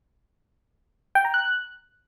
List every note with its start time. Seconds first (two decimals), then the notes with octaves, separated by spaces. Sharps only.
1.15 G5
1.25 A#5
1.34 F#6